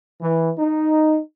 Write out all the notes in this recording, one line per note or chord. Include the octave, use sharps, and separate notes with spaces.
E3
D#4